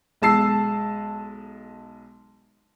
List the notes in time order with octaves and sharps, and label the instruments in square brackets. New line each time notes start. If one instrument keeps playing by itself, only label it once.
[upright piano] B1 G#3 A5 E6 C7